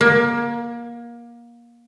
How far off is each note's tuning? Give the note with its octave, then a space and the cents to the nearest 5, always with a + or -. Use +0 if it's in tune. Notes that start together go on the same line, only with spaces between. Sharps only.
A#3 +25